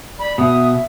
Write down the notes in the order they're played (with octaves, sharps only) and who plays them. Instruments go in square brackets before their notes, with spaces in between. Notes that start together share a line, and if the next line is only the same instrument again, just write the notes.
[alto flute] D5 [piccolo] B5
[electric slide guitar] B2 [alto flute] E5 [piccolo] D#6